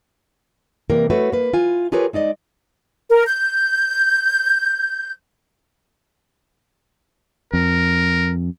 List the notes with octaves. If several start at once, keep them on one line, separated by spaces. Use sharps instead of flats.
C3 E3 G3 A#3 A#4
A3 F#4 B4 C#5
A#3 B4
F4 G#5
F4 G4 G#4 A#4 B4 C#5
G#3 D#4 D5 D#5
A#4
G6
F2 A#4